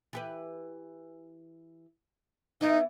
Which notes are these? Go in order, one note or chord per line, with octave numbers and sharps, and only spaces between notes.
E3 G4 B4
E3 B3 D#4 E4